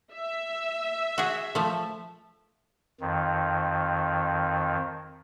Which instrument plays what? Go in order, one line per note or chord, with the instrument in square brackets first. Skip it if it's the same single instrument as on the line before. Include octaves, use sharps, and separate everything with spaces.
[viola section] E5
[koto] F#4 G#4
F3 A3
[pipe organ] F2 D#3